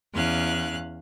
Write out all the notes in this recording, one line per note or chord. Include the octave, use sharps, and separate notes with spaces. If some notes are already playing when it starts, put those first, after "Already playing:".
E2 C#4 F5 F#6